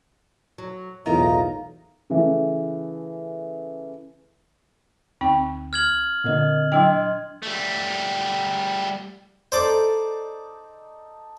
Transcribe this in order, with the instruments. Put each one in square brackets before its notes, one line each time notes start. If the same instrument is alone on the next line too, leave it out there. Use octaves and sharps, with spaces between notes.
[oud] F#3
[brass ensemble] B1 E2 A2 [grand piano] D#4 [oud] F4 A#4 [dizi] A#5
[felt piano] C#3 E3 A3
[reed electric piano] D2 [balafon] C4 D#4 G5
[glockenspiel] F6 G#6 F#7
[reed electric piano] A#2 D3 [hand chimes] C4 A#4 D#5
[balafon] F#3 E4 G5 [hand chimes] D4 D#5 C6
[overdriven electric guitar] G3 A3
[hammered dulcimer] D#4 A4 [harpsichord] C5 D5 D6